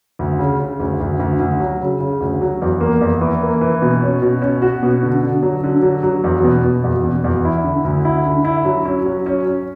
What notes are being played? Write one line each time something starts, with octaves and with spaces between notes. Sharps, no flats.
D2
C#3
C#3
D2
D2
D2
D2
F#3
C#3
C#3
D2
F#3
E2
A#3
E2
E3
A#3
E3
B2
C#4
B2
C#4
F#4
B2
D3
D3
F#3
D3
F#3
F#3
E2
B2
B2
E2
B2
E2
E4
D3
D2
E4
D3
E4
F#3
C#4
F#3
C#4
C#4